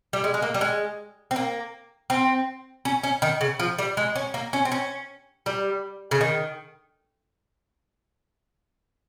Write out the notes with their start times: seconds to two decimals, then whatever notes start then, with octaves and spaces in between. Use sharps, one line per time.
0.13 G3
0.24 G#3
0.34 G#3
0.42 A#3
0.54 G3
0.61 G#3
1.31 C4
1.36 A#3
2.10 C4
2.85 C#4
3.03 C#4
3.22 D#3
3.41 C#3
3.59 F3
3.78 G3
3.97 G#3
4.16 C#4
4.34 A#3
4.53 C#4
4.65 C4
4.72 C#4
5.46 G3
6.11 C#3
6.21 D#3